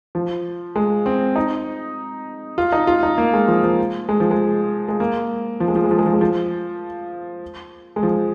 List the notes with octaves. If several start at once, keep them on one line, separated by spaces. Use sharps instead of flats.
F3
G#3
C4
D#4
F4
D#4
F4
D#4
A#3
G#3
F3
F3
G#3
F3
G#3
G#3
A#3
F3
G#3
F3
G#3
F3
G#3
F3
G#3
F3
G#3
F3